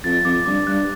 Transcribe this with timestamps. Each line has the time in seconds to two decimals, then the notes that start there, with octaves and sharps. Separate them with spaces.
0.04 F2 A6
0.25 F2 D6
0.46 G2 D6
0.67 G2 F#6